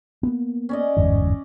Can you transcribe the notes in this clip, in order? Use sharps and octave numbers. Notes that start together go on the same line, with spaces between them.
A#3 B3
C#4 D5 D#5
G1 E2 G#2